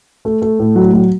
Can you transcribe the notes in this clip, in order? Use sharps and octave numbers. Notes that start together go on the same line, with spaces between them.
A3
A3
A2
F#3
F#3